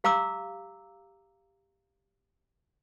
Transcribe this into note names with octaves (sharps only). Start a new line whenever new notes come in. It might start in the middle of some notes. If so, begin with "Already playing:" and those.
G4 F5 A#5 D6 E6